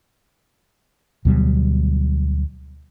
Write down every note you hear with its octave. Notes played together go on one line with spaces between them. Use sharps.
D2 B2 F#3 G3